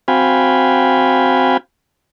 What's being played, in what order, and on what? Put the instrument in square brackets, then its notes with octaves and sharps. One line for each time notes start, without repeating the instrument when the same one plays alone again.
[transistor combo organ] C4 F#4 F5 G5 G#5 B5